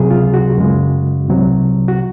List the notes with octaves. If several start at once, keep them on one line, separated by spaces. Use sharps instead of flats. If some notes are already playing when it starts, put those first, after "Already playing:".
Already playing: C#2 C3 F#3 G#4
F4
F#4
F#2 C#3 G#3
C2 C3 F#3
F#4